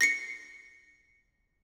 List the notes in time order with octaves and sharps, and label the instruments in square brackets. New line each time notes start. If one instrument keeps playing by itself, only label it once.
[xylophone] A#6 C7 C#7